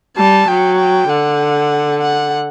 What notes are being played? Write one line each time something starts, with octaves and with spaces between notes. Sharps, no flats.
G3 A5
F#3 G5
G5
D3 F#5
F#5